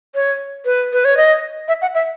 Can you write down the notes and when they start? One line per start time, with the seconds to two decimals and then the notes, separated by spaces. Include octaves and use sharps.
0.15 C#5
0.65 B4
0.93 B4
1.05 C#5
1.17 D#5
1.68 E5
1.82 F#5
1.95 E5